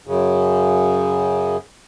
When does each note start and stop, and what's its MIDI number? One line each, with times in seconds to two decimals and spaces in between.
0.07 1.57 42
0.07 1.57 49